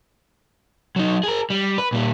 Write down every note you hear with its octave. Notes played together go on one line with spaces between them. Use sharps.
F#3 D#4
G#4 A#4
G3
B4
A#2 G3